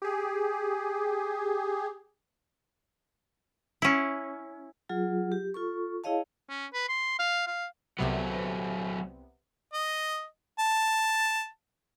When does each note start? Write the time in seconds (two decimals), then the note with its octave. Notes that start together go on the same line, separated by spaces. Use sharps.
0.02 G4 G#4
3.82 C#4 E4
4.89 F#3 F4 G#4
5.32 G4
5.54 F4 A4 C#6
6.04 E4 G#4 C#5 D#5 F5 A5
6.49 C#4
6.74 B4
6.88 C6
7.19 F5
7.47 F5
7.99 C2 C3 F#3 A3 B3
9.73 D#5
10.59 A5